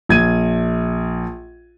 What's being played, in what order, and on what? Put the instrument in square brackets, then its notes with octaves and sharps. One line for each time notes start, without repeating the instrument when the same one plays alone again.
[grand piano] A#1 G#6 D#7